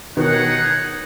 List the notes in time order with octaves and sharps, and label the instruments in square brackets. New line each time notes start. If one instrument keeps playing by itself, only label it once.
[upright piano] B2 D#3 [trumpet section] D#4 G#4 C#5 F#5